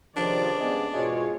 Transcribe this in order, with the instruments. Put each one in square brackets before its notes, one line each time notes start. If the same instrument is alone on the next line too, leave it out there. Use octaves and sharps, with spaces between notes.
[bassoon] C#2 [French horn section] C3 D#3 F3 [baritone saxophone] D4 [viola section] D5
[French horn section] C#3 G3 B3 [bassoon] G#3
[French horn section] E2 G#2 B2 [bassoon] G#3 [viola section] F4 C#5